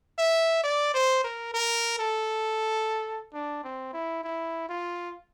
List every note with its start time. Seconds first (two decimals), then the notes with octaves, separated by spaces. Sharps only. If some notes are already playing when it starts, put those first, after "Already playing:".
0.19 E5
0.64 D5
0.94 C5
1.24 A#4
1.54 A#4
1.99 A4
3.33 D4
3.64 C4
3.93 E4
4.24 E4
4.69 F4